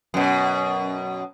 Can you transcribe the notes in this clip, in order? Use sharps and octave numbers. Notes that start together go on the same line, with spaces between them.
F#2 B2